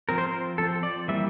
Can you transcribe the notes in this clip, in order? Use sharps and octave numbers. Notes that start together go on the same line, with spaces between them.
F3 C4 A#4
C5
A#4
F3 C4 A4
D5
E3 G3 A#3 E5